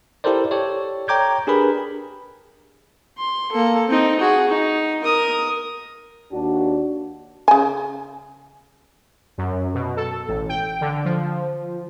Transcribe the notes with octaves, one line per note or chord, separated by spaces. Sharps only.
E4 G4 A4 A#4 C5 D5
G4 A4 C#5 D5
C#5 G5 A#5 D6 G6 G#6
D4 G4 G#4 A#4 B4 B5
C6
A#3 A4
C4 D#4
F#4 G#4
D#4
A#4 D#6
D#2 D4 F#4
C#3 G#5
F#2
B2
A4
A1
G5
D3
F3